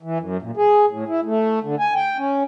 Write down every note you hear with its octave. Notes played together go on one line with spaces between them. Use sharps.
E3
F#2
A#2
G#4
A2
E4
A3
D3
G#5
G5
C#4